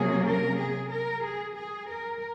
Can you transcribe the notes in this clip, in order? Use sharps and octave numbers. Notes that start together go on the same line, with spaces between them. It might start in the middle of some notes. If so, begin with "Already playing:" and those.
Already playing: C3 F#3 A#3 C#4 G#4
A#4
G#4
A#4
G#4
G#4
A#4